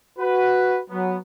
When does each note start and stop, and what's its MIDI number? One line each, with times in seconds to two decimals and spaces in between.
0.19 0.80 66
0.19 0.80 71
0.90 1.16 54
0.90 1.16 59